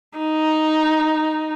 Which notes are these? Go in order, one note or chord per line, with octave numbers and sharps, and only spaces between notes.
D#4